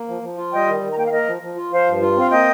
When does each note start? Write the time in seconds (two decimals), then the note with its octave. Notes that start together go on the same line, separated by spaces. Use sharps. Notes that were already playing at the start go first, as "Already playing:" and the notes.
Already playing: A#3
0.08 F3
0.22 F3
0.37 F4
0.52 G3 D#5 G5
0.67 D#3
0.82 D#3
0.91 A#5
0.98 A#3 G5
1.05 F5
1.12 A#3 A#4 D#5
1.27 F3
1.42 F3
1.56 F4
1.71 F3 C5 F5
1.86 G2
2.02 F4
2.16 C4 F5
2.31 A#3 D#5 G5